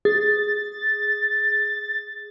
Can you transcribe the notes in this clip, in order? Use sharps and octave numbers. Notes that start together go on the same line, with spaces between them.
G#4 A6